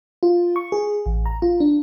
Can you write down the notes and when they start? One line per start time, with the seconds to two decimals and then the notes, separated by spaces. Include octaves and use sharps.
0.23 F4
0.56 C#6
0.72 G#4
1.06 A1
1.26 A#5
1.42 F4
1.60 D4